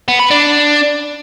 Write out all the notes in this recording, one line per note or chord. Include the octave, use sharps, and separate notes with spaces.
B3
B4
D4